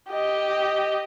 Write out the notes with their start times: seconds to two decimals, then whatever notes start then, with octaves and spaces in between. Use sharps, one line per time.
0.11 G4 D#5